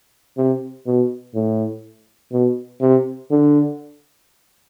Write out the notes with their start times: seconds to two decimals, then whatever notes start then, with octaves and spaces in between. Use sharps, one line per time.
0.37 C3
0.86 B2
1.35 A2
2.32 B2
2.81 C3
3.31 D3